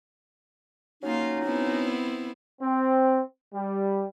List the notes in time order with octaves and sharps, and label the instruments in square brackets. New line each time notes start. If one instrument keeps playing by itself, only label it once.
[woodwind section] F#3 C#4 D#4 [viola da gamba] A#3 F4
[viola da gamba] B3 C4 E4
[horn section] C4
G3